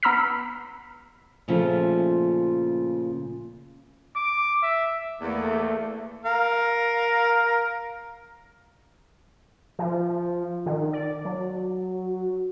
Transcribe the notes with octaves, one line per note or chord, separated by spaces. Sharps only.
B3 A#5 B5 E6 F6 B6
A#2 C#3 F3 A3 F4
D6
E5
E2 A3 A#3 D5
A#4 F5
F3
D#3
D5
F#3